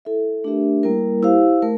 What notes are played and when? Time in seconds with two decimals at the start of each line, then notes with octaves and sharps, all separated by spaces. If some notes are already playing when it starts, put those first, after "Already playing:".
0.05 E4 A4 E5
0.44 A3 D4 G4 A#4 E5
0.83 G3 A#3 E4 A#4
1.23 E4 G4 C5 F5
1.62 A3 A#4